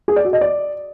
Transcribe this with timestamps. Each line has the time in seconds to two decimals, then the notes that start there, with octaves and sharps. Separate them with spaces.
0.08 G#4
0.16 D5
0.25 F#4
0.33 D#5
0.41 D5